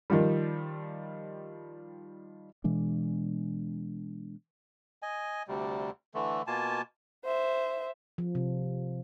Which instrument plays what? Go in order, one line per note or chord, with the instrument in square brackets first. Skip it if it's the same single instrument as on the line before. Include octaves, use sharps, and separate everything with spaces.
[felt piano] D#3 F3 G3
[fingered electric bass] B2 E3 G#3 D4
[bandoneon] D#5 G#5
D2 C3 G3
D3 E3 A3
B2 A#3 F4 G#5 A5
[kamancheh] C5 E5
[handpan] F3
C3